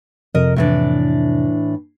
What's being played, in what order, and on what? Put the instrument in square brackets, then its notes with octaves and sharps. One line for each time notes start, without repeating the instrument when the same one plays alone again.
[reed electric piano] F2 C3 [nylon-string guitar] A#4 D#5
[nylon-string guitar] A2 E3 D4